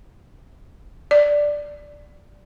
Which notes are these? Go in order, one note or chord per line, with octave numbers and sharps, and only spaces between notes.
D5